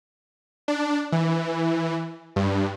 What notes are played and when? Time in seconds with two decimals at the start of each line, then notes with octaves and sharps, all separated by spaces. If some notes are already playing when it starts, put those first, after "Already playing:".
0.68 D4
1.12 E3
2.36 G2